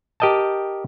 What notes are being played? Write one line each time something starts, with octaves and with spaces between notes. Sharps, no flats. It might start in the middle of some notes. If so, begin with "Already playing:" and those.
G4 A#4 D#5 G5 A5